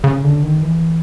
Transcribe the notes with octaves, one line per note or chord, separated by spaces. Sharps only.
C#3
D3
D#3
E3